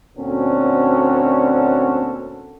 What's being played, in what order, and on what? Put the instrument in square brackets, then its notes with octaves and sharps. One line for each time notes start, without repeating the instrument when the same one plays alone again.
[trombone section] D2 A#2 C4 C#4 F#4 A4